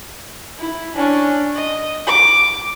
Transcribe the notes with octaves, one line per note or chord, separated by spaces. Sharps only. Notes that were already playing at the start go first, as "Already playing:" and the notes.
E4
C#4 D4
D#5
D6